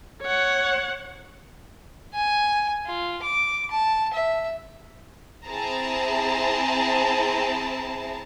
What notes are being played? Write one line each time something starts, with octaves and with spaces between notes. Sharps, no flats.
C#5 F#5
G#5
F4
D6
A5
E5
C4 E4 G#4 A5 A#5